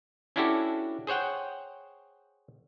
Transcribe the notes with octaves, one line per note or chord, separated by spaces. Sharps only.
C#4 D4 E4 F#4 G4 A4
G#4 C5 C#5 F#5 G5